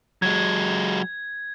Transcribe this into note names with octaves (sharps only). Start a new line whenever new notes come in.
F#3 G#3 G#6